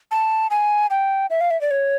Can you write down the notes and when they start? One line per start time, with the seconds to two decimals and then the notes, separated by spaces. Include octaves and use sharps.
0.11 A5
0.51 G#5
0.90 G5
1.30 E5
1.41 F5
1.51 E5
1.61 D5
1.71 C#5